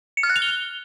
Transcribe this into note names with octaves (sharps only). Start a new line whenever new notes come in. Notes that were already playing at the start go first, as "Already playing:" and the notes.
C#7
F6
F#6
F7
G7